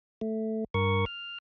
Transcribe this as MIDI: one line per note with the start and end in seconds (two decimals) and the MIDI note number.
0.21 0.64 57
0.74 1.05 43
0.74 1.05 70
0.74 1.05 85
1.06 1.38 89